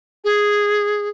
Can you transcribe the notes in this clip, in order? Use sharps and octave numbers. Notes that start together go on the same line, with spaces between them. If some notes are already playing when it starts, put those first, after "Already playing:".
G#4